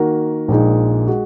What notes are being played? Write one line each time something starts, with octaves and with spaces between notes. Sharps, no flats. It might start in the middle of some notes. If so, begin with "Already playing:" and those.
Already playing: D#3 A#3 F#4 A#4
A#1 A#2 G#3 D#4
G#3 F#4